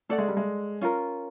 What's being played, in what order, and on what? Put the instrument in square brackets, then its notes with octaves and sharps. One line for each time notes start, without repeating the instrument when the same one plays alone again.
[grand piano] A3 [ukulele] A4 D5 F#5
[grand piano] G#3
G3
G#3
[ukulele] C#4 F4 A#4